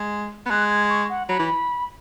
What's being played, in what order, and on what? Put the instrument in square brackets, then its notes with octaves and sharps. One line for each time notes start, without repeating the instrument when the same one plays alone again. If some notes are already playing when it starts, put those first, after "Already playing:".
Already playing: [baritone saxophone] G#3
B3
[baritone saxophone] G#3 [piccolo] F#6
[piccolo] G#6
C#6
F#5
[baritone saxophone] F#3 [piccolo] B5
[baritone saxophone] E3